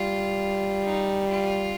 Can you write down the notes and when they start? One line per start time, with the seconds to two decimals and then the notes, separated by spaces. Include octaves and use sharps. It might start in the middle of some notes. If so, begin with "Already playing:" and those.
Already playing: G3 F4
0.85 D#4
1.29 F4